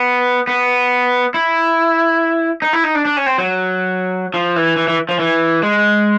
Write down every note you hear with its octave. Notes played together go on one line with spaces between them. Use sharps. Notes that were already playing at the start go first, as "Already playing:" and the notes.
Already playing: B3
B3
E4
D#4
E4
D#4
D4
D4
C#4
C4
F#3
F3
E3
E3
E3
F3
E3
G#3